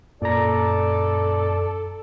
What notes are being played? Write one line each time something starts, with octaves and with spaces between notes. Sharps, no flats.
F#2 A#2 A4 D5 A#5